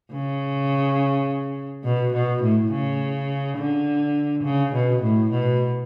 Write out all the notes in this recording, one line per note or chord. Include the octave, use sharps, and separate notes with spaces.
C#3
B2
B2
A2
C#3
D3
C#3
B2
A2
B2